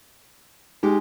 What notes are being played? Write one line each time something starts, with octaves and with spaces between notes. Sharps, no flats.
G#3 D#4 G4